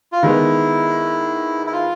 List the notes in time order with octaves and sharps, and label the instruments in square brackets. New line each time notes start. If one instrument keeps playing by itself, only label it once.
[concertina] F4
[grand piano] D#3 G#3 B3 [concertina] E4
[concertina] E4
F4